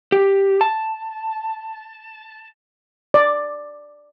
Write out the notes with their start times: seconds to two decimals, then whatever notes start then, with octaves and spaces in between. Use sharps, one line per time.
0.12 G4
0.61 A5
3.14 D5